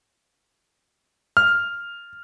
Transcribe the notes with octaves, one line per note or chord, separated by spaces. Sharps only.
F6